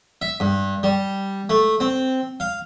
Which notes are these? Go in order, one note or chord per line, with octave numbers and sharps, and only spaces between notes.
E5
G2
G3
A3
C4
F5